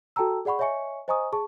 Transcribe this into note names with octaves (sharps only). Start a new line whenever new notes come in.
F#4 A4 G5 A5 A#5 E6
G#4 D5 F#5 B5 C#6
C#5 D#5 E5 G#5 C#6 C#7
C5 D#5 G#5 A#5 C#6 D#6
G#4 A5 C#6